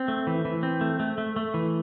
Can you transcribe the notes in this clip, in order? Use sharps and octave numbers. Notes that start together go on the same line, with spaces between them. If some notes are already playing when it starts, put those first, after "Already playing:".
Already playing: C4
A3
E3
E3
C4
A3
A3
A3
A3
E3